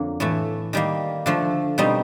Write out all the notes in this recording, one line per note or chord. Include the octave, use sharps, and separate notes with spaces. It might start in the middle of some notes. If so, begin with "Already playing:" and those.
Already playing: F2 D3 F#3 A#3
A2 E3 A3
D#3 G3 A#3
D3 F3 A3
B2 G3 C4 D#4